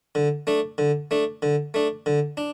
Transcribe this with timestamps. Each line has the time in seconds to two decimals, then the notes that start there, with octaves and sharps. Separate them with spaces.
0.15 D3
0.47 A3 D4
0.78 D3
1.11 A3 D4
1.42 D3
1.74 A3 D4
2.06 D3
2.37 D4